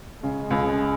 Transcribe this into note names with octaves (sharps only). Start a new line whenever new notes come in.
C#3 G#3
C#2